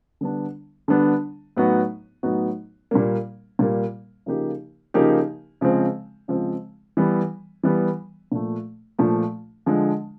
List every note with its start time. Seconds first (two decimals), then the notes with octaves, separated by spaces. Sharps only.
0.21 D3 G3 B3 D4
0.88 D3 G3 B3 D4
1.57 A2 F#3 B3 D#4 F#4
2.23 A2 F#3 B3 D#4 F#4
2.91 A#2 G3 A#3
3.59 A#2 G3 A#3
4.26 C#3 F3 A#3 D#4 G4
4.94 C#3 F3 A#3 D#4 G4
5.61 C#3 F3 G#3 C4
6.28 C#3 F3 G#3 C4
6.97 E3 G3 B3
7.63 E3 G3 B3
8.32 A#2 F3 A3
8.99 A#2 F3 A3
9.66 D3 F3 G#3